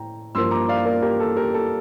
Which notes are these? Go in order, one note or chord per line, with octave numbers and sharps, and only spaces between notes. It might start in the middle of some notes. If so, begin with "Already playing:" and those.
Already playing: A2 G5 A#5
G2 F3 A#3 C6 E6
A#5 D6
D5 F5
A#4 D5
G4 A#4
A4
G4 A#4
A4